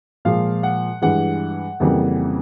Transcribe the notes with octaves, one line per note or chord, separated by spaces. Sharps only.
A#2 F3 G#3 F5
F#5
G2 E3 G#3 F#5
F2 C#3 E3 G3 A#3